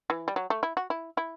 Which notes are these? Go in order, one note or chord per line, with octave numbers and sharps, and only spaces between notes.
E3
G3
F#3
A3
E4
F#4
E4
E4